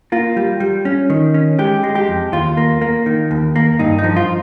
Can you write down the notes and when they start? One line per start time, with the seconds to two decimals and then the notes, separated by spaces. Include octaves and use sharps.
0.12 A#3 F4
0.37 G3
0.60 G3
0.85 C#4
1.10 D#3
1.34 C#4
1.58 G#3 G4
1.83 G#3
1.95 G4
2.08 F2
2.33 D#2 F4
2.57 A#3
2.81 A#3
3.06 D#3
3.31 D#2
3.56 A#3
3.79 G2 D#4
3.98 D#4
4.04 F3
4.16 F4